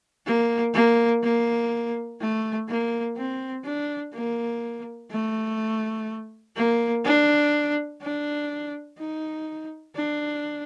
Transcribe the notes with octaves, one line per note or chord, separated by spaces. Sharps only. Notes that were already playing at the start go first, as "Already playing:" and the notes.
A#3
A#3
A#3
A3
A#3
C4
D4
A#3
A3
A#3
D4
D4
D#4
D4